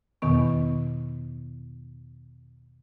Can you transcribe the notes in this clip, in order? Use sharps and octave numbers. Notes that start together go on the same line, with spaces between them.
E2 B2 D#3 B3 C#6